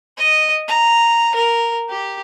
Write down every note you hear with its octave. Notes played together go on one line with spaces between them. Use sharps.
D#5
A#5
A#4
G4